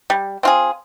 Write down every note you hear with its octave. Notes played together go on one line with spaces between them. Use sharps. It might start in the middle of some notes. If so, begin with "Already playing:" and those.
G3
C4 F4 G#4